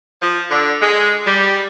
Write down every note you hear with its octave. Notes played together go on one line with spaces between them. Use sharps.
F3
D3
G#3
G3